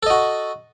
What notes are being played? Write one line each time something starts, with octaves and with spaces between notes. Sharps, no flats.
F#4 A4 D#5